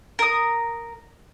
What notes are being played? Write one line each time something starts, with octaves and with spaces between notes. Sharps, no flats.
A#4 D#6